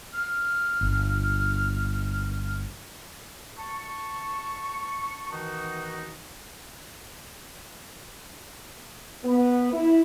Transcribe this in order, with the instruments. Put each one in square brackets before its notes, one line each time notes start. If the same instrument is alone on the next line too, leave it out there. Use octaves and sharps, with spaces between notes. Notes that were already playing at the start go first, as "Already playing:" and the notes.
[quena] F6
[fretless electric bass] G1
[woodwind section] A5 C#6
D#3 E3 D#4 F#4
[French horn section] B3
E4